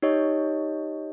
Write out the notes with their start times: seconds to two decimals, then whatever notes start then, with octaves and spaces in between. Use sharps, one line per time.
0.02 D#4 G4 C#5 D#5